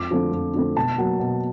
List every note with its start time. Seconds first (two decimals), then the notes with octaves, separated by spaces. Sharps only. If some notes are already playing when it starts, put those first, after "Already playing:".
Already playing: F2 D6
0.10 D3 F3 A3 C4
0.32 F2
0.54 D3 F3 A3 C4
0.76 B2 A5
0.98 F#3 A#3
1.19 B2